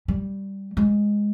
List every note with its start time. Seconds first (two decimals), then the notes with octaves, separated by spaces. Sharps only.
0.08 G3
0.77 G#3